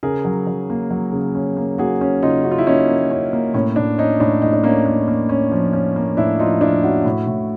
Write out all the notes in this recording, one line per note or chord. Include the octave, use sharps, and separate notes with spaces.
C#3 G#4 A#4
F#3
F#3
A#3
F#3
C#3
C#4
A#3
A#3 F#4 G#4
C#4
C#3 D#4 F4
C#3 F#4
F4
E4
A#3 C#4 D#4
A#3
C#4
A#3
A2 C#4
A2 D4
C#4 D#4
A2 D4
A2 D#4
D4
A#3 C#4 D#4
A#3
A#3
C#4
F3
C#4
A#3
A2 D4 E4
F3 D#4 F4
F3 D4 E4
C#4 E4 F#4
A2
A2